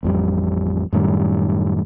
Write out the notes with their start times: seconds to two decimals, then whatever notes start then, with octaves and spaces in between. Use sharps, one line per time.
0.03 A1 F2 G3
0.93 F#2 A2 D#3 G3